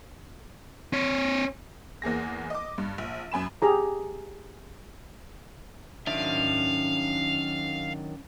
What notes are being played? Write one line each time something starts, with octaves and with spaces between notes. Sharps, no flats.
C4 C#5
E2 A#3 G#4 A#6
D#5 D6
G2
A#1
F#2 G#5 B5 E7
G4 G#4 A#5
D#3 F#3 C#4 D4 E5 F5